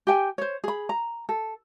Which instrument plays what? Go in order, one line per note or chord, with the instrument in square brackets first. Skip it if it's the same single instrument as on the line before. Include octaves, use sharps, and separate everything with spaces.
[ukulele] G4 G5 G#5
C5 C#5
G#4 B5
A#5
A4